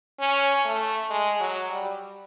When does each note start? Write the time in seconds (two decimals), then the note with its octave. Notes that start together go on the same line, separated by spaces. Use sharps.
0.20 C#4
0.65 A3
1.10 G#3
1.40 F#3
1.71 G3